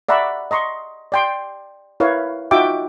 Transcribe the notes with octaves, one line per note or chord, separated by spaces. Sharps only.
D5 E5 F#5 A#5 B5 C#6
D#5 A#5 C6 C#6
D5 G5 C6
E4 A#4 B4 C#5 E5 F5
D#4 F4 F#4 E5 G5 D6